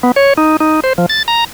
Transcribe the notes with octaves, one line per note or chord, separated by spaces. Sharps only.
B3
C#5
D#4
D#4
C5
F3
A6
A#5